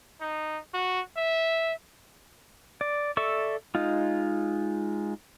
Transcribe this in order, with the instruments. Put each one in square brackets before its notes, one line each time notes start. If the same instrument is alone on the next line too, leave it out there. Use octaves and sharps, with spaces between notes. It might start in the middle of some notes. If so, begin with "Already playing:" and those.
[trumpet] D#4
F#4
E5
[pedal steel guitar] D5
A4 D5 E5 C#6
G#3 D#4 F4